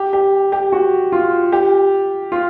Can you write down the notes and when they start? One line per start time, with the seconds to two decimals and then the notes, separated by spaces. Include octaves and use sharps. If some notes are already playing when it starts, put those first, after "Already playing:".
Already playing: G4
0.13 G4
0.52 G4
0.72 F#4
1.12 F4
1.52 G4
2.32 F4